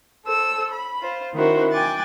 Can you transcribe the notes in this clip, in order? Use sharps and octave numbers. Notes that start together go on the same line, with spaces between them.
A4 C5 E6
B5
F4 C5
D#3 C#4 E4 F#4 A#4 C5
G5 G#5 D6 F#6 A6